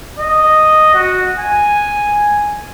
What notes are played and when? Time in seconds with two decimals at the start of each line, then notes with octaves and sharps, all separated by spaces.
0.19 D#5
0.94 F#4
1.38 G#5